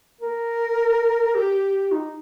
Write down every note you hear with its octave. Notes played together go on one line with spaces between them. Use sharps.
A#4
G4
D#4